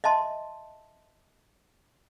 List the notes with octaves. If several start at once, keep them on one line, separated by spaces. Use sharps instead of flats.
D#5 E5 A5 C6